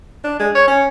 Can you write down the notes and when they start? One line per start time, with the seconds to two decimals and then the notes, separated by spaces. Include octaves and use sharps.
0.24 D4
0.39 G#3
0.55 C#5
0.68 C#4